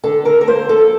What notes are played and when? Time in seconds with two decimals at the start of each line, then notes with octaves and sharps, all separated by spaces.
0.04 D3 A4
0.25 D3 A#4
0.41 A#4
0.47 A#3 C5
0.69 F3 A4